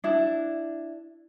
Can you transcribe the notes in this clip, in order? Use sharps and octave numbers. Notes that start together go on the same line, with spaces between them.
D4 E4